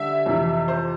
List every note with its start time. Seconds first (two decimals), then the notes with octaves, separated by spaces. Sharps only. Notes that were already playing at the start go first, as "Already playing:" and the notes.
Already playing: D3 G3 E5
0.26 F2 C3 E3
0.68 C5